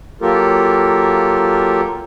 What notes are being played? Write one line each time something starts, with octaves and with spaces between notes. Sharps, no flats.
F#3 A#3 F4 G4 A4 A#4